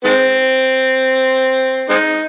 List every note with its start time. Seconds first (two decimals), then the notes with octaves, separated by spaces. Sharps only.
0.05 D#3 G#3 C4
1.90 G#3 C4 D#4